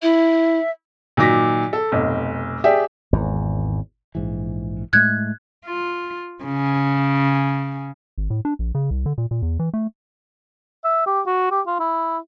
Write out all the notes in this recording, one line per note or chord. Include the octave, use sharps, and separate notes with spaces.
E4 E5
A#2 D#3 F#3 D6 A#6 B6
A4
F1 B1
G4 G#4 D5 E5 G5
G#1 E2
A#1 G#2 E3
A2 G#3 A3 F#6 G#6
F4
C#3
G#1
A2
D4
A#1
C#3
C2
D3
A#2
A#2
E2
E3
A3
E5
G4
F#4
G4
F4
E4